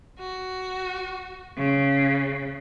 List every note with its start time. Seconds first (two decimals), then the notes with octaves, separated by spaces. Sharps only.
0.19 F#4
1.57 C#3